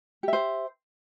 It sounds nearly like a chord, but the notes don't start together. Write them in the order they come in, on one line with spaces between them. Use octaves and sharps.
G4 E5 C5